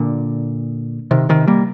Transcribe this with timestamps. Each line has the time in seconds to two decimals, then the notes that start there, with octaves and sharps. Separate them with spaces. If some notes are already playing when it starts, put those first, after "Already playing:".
Already playing: A#2 D3
1.11 C3 D#3
1.29 C3 D#3
1.47 G3 A#3